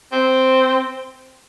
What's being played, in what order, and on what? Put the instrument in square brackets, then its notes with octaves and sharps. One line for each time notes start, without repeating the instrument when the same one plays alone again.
[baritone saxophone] C4